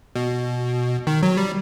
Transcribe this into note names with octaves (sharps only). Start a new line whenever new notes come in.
B2
D#3
F#3
G3